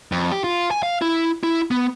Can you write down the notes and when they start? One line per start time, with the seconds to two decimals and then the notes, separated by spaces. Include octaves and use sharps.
0.12 F2
0.32 G4
0.44 F4
0.71 G#5
0.83 F5
1.02 E4
1.43 E4
1.71 B3